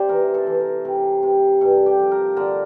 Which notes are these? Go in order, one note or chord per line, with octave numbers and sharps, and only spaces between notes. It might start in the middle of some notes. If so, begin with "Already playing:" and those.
Already playing: C3 C5 D5 E5
E3 A#4
A4
E3
A#4
C3
C3
G2 A4
G4
F3
A#4
D3 A#4